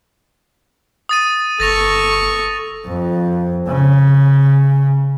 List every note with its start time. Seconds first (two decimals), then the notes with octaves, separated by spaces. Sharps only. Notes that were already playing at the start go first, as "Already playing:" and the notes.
1.09 D#6 A6 D#7
1.60 G1 A4 C#6 A6 A#6 F7
2.86 F2
3.68 C#3